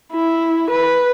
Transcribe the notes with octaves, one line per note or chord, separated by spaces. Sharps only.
E4
B4